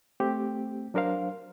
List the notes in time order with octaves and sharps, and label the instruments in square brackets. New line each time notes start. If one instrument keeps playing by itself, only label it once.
[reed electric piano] A3 C4 G4
F#3 D4 A#4 C5 F5